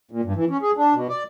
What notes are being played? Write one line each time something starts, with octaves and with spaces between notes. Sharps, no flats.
A#2
G2
E3
C#4
G#4
D4
B2
D5